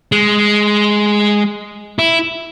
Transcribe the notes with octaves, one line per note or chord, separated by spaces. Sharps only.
G#3
E4